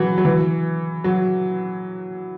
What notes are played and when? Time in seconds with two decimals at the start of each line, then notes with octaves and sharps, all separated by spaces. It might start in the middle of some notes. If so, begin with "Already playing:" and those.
Already playing: E3 F#3
0.18 F#3
0.25 E3
1.04 F#3